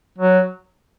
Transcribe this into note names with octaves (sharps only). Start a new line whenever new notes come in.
F#3